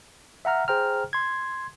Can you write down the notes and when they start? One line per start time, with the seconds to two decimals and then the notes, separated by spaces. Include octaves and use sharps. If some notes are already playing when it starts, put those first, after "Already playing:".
0.45 E5 F#5 A#5 F6
0.68 G#4 C5 G5 A#5 F6
1.13 C6 G#6